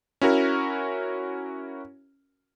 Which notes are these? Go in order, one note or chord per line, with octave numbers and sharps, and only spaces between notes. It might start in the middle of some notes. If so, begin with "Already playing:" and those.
C#4 E4 F#4 A#4